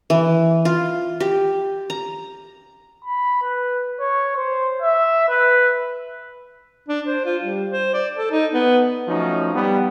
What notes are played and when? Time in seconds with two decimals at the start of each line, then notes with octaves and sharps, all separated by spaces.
0.10 E3
0.65 F4
1.20 G4
1.90 A#5
3.04 B5
3.42 B4
4.00 C#5
4.36 C5
4.82 E5
5.29 B4
6.88 D4
7.07 C5
7.25 F4
7.43 G3
7.70 C5
7.94 D5
8.17 A4
8.31 D#4
8.53 B3
9.08 F3 F#3 A3 C#4 D#4
9.55 G3 B3